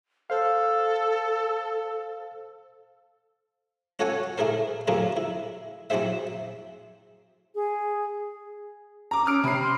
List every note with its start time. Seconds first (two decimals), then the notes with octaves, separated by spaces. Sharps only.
0.30 A4 C5 F5
3.99 C#4 F#4 A4 C#5 F#5 G#5
4.38 A3 E4 G#4 A#4 C5
4.88 A2 F#3 A#3 C4 D4 G#4
5.17 E4
5.90 F#3 C4 E4 G#4 C5 E5
7.55 G#4
9.11 A#5 D6
9.26 C#4 D#6 F6 D7
9.44 C3 B5 C7
9.63 C6